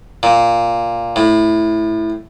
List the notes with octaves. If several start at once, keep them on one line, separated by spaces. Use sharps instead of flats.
A#2
A2